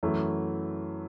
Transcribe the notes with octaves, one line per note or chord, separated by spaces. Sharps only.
F#2 E3 A3